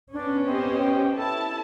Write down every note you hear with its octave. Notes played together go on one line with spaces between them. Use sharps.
B3 C#4 D4
C4 G4 C5 D#5
G5
E4 A4 A5